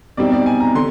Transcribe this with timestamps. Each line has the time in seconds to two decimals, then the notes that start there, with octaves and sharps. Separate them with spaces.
0.17 B2 G3 C4 D#4 D5
0.32 D5
0.46 G#5
0.60 A#5
0.75 D3 C6